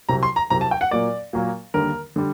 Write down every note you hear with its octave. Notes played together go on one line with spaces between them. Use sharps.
C2 C3 F#3 A#5
C6
A#5
C2 C3 F#3 A#5
A5
G5
F#5
A#2 F#3 A#3 D5
A#2 F#3 A#3
D#2 D3 G3 A#3 A#4
D3 G3